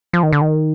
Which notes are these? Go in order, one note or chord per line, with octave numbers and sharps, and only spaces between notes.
F3
D#3
D3
D#3